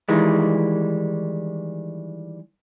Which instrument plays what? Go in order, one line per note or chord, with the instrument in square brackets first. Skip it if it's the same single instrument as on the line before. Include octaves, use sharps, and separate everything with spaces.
[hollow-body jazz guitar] D#3 E3 G3 G#3